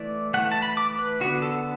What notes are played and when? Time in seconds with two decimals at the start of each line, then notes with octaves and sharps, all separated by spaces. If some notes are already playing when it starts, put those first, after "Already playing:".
Already playing: E3 A3 D5
0.34 E3 A3 F#5
0.52 A5
0.62 B5
0.77 D6
0.99 B4
1.20 D3 B3 F#4
1.42 A4